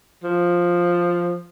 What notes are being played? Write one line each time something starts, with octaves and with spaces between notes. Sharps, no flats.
F3